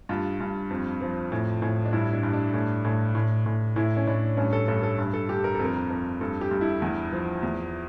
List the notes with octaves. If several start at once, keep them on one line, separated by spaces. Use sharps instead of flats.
G2 F4
G2
F2
F3
A2
A2
D4
G2 E4
D4
G2
D4
A2
A2
A2
A2
A2 E4
C#4
A2 D4
G2 C#4
A4
G2 A4
A4
G2
A4
G2 G4
A#4
F2 A4
A#4
F2
G2 A4
G4
G2
E4
E2
F3
E2